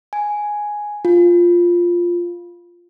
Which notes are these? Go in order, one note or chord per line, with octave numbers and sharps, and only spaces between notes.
G#5
F4